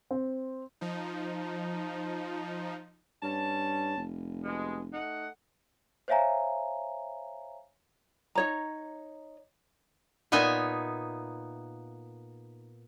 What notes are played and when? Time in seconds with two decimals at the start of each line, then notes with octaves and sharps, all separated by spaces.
0.11 C4
0.81 F3 D#4
3.23 G2 C#4 A5
3.98 F1
4.44 B2 G#3
4.93 A3 D#4 F#5
6.08 C5 C#5 E5 F5 G#5 A#5
8.35 D#4 C#5 A#5
10.32 A#2 B3 D#4 E5 G#5